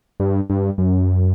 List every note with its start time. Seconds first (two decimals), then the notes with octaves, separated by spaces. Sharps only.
0.20 G2
0.50 G2
0.78 F#2